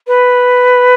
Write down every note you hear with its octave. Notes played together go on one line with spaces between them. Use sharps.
B4